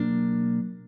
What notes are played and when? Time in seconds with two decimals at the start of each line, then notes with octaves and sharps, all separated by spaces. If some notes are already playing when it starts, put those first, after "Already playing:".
Already playing: B2 F#3 A#3 D4